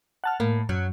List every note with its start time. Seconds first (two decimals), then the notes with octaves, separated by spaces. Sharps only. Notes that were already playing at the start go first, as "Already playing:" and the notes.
0.24 F#5 A5 F6
0.40 A2 A#3
0.69 F#2 F#3